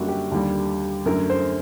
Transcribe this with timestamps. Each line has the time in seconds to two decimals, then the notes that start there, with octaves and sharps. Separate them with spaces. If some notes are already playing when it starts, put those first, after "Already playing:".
Already playing: F#2 D3 G3 A#3 D4 F#4
0.08 G4
0.32 D#2 D3 G3
1.06 F#2 D3 A3 A#4
1.30 C5